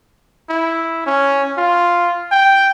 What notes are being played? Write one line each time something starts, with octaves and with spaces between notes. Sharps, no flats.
E4
C#4
F4
G5